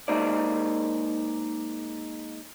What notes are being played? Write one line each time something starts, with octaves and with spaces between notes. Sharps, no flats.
G#3 A#3 D#4 A#4 C5 D5